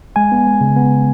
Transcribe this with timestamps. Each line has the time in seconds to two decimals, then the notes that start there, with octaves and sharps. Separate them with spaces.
0.16 G#3 G#5
0.32 B3
0.47 G#3
0.61 C#3
0.76 B3